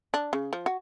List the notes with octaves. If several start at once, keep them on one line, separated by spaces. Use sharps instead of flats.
D4
C#3
F3
F#4